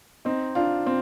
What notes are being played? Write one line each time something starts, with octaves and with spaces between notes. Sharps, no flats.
C4 D#4
D4 F4
C4